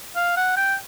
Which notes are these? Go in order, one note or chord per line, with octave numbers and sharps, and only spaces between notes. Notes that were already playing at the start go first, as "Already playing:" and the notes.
F5
F#5
G5